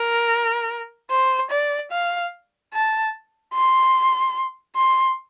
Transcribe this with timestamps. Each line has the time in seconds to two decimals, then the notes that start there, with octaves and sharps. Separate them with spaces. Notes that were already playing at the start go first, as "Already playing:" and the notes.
Already playing: A#4
1.11 C5
1.51 D5
1.91 F5
2.74 A5
3.54 C6
4.76 C6